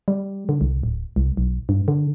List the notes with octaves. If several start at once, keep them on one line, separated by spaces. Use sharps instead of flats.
G3
D3
C2
D1
C2
B1
G2
D3